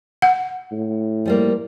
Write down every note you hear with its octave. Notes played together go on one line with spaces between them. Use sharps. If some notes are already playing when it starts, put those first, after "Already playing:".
F#5
A2
F3 G3 A#3